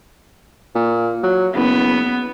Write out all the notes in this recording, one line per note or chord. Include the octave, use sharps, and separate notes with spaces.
A#2
F#3
F#1 B3